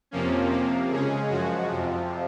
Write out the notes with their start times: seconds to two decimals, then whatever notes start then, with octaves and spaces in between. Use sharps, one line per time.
0.11 F2 C3 F3 A#3 C#4
0.51 C3 F3 A#3
0.90 C#3 G#3 C#4 G#4
1.29 F#2 F3 G#3 F#4
1.69 F2 C3 F3